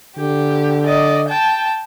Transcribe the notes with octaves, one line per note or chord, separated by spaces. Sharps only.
D3 G4
D5 D#5
G5 A5